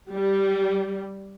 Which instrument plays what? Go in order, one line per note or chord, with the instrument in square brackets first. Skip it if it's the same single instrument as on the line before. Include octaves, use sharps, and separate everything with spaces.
[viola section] G3